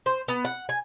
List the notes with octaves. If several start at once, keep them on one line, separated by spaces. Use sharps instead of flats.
C5
B3
F#5
G#5